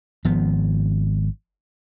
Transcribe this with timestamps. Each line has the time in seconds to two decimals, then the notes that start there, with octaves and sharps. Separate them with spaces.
0.25 G#1 F3 B3